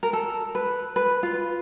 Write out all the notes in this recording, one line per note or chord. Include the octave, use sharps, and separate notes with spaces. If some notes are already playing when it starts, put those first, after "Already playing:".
A#4
A4
B4
B4
F4